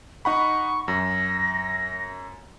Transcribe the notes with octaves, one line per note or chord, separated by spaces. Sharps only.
D#4 F#5 B5 C#6
F#2 A#6